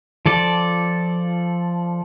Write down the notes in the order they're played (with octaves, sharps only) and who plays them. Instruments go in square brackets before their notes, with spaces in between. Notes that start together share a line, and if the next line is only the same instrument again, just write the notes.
[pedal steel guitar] F3 A4 D5